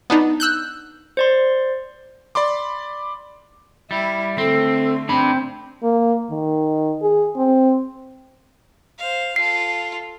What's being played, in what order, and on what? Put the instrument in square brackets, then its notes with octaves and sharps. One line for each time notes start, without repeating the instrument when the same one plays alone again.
[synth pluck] B3 D4 D#4
E6 F#6 G6
[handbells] C5 D5 C6
[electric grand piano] D5 B5 C6 D6
[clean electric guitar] G3 [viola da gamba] E4
[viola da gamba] D3 A3 [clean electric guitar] C4 [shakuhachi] A4
[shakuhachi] C4 [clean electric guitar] D4 B5
[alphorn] A#3
D#3
G#4
C4
[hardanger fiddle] C5 F5
[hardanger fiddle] F4 A4 [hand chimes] C7